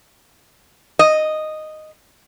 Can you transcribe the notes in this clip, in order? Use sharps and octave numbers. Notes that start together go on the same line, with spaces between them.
D#5